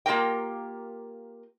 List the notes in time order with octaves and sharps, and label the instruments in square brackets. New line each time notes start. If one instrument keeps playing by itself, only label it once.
[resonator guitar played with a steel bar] A#3 F4 G4 A#4 G5